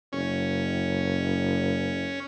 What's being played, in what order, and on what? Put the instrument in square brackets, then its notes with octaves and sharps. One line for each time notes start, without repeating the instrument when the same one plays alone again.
[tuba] F#1 [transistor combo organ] C#4